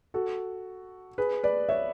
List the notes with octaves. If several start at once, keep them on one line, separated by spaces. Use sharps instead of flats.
F#4 A4
G#4 B4
B4 D5
C#5 E5